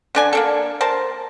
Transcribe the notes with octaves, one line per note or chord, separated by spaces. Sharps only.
D3 D4 G#5
A#3 D4 A4
A#4 C5 A5